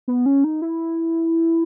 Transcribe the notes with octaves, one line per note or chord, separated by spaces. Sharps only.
B3
C#4
D#4
E4